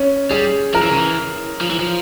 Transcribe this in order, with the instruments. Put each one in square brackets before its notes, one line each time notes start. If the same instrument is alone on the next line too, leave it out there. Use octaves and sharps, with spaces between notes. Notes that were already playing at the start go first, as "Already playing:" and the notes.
Already playing: [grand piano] C#4
[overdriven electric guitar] G3 [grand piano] G#4
[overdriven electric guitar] F3 [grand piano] A#4
[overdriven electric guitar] E3
C#3
E3
F3
E3
F3